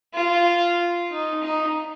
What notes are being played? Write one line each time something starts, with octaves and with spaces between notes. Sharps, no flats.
F4
D#4
D#4